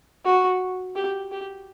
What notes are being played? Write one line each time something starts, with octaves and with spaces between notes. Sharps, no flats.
F#4
G4
G4